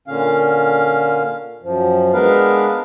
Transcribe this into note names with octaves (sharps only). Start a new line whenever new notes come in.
A#2 D3 C#4 F5
F#2 F3
G#3 B3 D4 A#4 B4 F5